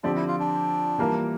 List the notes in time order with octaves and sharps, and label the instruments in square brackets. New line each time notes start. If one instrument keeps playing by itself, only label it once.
[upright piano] D3 F3 C4 G4 D5 [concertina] D4
[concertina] E4
F4
D4
[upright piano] E3 G3 A#3 F4 A#4